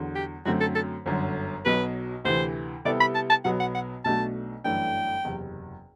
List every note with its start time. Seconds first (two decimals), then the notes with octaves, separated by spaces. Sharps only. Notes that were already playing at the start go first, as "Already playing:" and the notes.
Already playing: E2 D3 F#3
0.15 G4
0.46 F#2 D3 F#3 A3 C4 F#4
0.61 A4
0.75 A4
1.06 G1 F#2 D3
1.65 B1 B2 F#3 B4
2.25 D2 C3 E3 C5
2.85 C3 G3 B3 E4 A4 D5
3.00 B5
3.15 A5
3.30 A5
3.45 B1 B2 F#3 B3 F#5
3.60 F#5
3.75 F#5
4.05 B1 B2 A3 D4 F#4 A5
4.64 G1 F#2 E3 A3 D4 G5
5.25 F#1 E2 C3